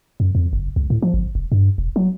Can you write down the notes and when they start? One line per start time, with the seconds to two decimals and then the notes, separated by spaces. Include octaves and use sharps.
0.20 F#2
0.35 F2
0.53 F#1
0.76 C#2
0.90 A2
1.02 F3
1.14 G1
1.35 F1
1.52 G2
1.78 E1
1.96 F#3